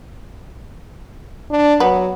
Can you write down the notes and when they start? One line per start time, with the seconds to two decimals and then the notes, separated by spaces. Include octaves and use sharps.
1.50 D4
1.80 F#3 B3